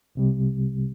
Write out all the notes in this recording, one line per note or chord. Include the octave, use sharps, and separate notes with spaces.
C2 C3 G3